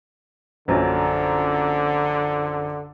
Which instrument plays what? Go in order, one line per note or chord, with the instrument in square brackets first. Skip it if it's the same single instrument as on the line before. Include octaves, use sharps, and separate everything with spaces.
[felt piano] A#1 F#2 F#3 [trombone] D3